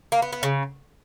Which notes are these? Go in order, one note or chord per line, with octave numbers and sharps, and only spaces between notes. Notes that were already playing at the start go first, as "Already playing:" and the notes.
A#3
B3
B3
C#3